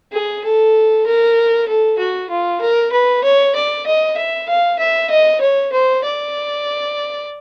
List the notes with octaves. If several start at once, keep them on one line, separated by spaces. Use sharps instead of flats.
G#4
A4
A#4
A4
F#4
F4
A#4
B4
C#5
D5
D#5
E5
F5
E5
D#5
C#5
C5
D5